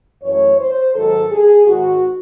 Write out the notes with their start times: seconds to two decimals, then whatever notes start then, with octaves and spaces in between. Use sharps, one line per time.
0.21 F#2 E3 A3 C#5
0.57 C5
0.94 G#2 D#3 F#3 A4
1.30 G#4
1.65 G#2 D#3 G#3 F#4